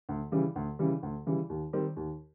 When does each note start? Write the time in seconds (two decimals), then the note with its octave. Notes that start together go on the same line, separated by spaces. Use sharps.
0.09 D2
0.32 C#3 E3 G3
0.56 D2
0.79 C#3 E3 G3
1.03 D2
1.26 C#3 E3 G3
1.49 D#2
1.73 D#3 G3 C4
1.96 D#2